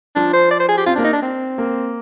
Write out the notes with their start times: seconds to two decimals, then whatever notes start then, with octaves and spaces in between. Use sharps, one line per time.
0.16 F3 D4
0.33 C5
0.51 D5
0.60 C5
0.69 G#4
0.78 G4
0.86 C4 F4
0.95 A#3 D4
1.04 D#4
1.13 D4
1.22 C4
1.58 A#3